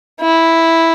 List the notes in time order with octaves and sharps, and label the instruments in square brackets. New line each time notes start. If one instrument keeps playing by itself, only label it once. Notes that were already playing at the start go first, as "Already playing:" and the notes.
[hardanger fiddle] E4